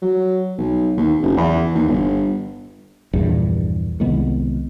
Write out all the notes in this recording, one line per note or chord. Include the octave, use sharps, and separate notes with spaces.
F#3
B1
D#2
F#1
E2
D#2
G1
A#1 E2 G2
C2 D#3 G#3 B3